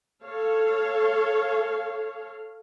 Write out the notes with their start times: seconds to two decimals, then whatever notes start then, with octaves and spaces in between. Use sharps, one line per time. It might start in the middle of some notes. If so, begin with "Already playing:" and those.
0.24 A4 C#5 F5